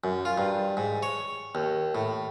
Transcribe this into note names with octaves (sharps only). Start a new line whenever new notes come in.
F#2
F4
G2
G#2
C#5
D#2
A2